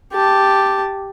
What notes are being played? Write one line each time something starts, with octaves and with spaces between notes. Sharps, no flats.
G4 A5